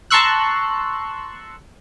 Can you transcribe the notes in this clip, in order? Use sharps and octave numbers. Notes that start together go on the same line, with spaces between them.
A5 A#5 C6 C#6 E6 F#6